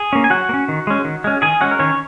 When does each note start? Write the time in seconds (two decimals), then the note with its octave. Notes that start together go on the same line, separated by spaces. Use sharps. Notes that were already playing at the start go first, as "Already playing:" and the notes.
Already playing: G#4
0.13 A#3 C#4
0.24 G#5
0.30 F#3 F#4 F#5
0.49 A#3
0.54 C#4
0.69 D#3
0.87 G#3 C#4
1.05 D#3
1.24 G#3 C#4
1.42 D#3 G#4 G#5
1.61 G#3 C#4 F#4 F#5
1.71 A#4
1.79 D#3 C#4 C#5